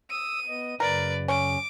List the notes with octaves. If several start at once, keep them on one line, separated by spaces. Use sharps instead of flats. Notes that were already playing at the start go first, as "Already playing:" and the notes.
D#6 E6 D#7
B3 D#5
F#2 C#3 A#4 B4 D5
C#4 D6